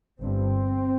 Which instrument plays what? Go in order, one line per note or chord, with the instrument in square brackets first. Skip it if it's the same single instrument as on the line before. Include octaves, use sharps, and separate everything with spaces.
[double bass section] G1 G2 C4